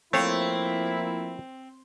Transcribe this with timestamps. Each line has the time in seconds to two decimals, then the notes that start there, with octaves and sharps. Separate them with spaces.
0.13 F3 A3 A#3 C4 E4 C#5 F5